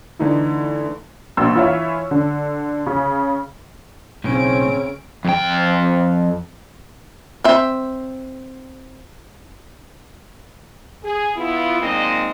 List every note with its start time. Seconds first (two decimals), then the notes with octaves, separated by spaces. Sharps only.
0.19 D3 E3 A3 D#4 E4
1.37 A#1 B2 C6 E6
1.55 E3 F4 C#5 E5
2.11 D3
2.86 C#3 C#4
4.24 B1 A2 C#3 C4 C#4 D7
5.25 F2 G5
7.44 C4 E5
11.04 G#4
11.36 B3 E4 F4
11.80 A#2 D#3 G#3 A#3 C4 D#5